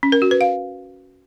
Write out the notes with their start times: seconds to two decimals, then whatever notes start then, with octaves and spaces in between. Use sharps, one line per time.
0.03 C#4
0.12 A#4
0.22 F#4
0.31 B4
0.41 F5